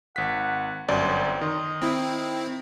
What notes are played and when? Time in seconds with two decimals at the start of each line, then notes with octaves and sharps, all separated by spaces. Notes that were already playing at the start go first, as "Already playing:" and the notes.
0.16 G#1 F#5 B6
0.88 G1 F#2 C4 D5
1.41 D#3 D#5
1.82 C4 E4